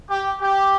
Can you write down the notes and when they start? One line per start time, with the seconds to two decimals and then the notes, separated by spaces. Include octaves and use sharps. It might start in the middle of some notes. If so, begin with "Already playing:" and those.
0.09 G4
0.41 G4